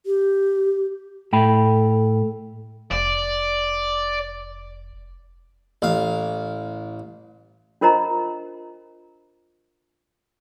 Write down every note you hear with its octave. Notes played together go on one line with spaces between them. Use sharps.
G4
A2 A4 G5 B5
F1 D5
A1 F5
D4 F4 A#4 C5 D#5 A#5